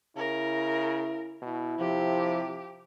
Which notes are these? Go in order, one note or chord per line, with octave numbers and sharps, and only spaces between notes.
C#3 E4 A#4
B2 E4
C3 F3 G4